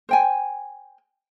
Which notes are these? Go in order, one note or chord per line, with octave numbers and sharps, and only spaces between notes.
C5 G5 G#5